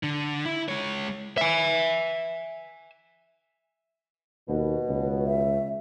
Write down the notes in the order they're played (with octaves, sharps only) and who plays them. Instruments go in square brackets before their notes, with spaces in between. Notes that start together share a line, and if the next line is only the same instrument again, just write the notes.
[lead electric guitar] D3
E4
G#3 C#5
[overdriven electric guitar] E5 G#5
[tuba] D#2 [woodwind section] B2
[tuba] C#2
[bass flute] E5